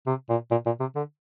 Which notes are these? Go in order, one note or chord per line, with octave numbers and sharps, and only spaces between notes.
C3
A#2
A#2
A#2
C3
D3